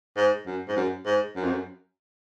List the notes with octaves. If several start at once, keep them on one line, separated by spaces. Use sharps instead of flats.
G#2
F#2
G#2
F#2
G#2
F#2
F2
F#2